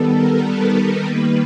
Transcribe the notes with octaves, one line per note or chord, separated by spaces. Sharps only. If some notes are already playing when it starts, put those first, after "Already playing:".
Already playing: D#3 G3 B3 A4
A#4
B4
D#3 G3 A#3 B4